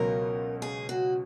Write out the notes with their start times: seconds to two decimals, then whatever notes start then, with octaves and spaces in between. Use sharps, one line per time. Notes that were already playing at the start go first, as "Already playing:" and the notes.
Already playing: C#2 B2 F#3 A#4
0.62 G#4
0.89 F#4